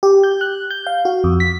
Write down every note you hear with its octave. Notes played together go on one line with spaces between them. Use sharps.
G4
G6
F#6
G6
F5
F#4
F2
B6